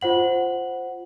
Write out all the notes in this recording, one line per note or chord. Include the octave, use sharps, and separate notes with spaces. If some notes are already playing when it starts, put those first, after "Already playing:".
F4 C5 F#5 F#7